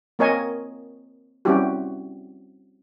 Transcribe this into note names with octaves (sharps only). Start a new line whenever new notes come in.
A#3 C4 A#4 C#5 D#5 G#5
G3 C4 C#4 E4 F#4 G4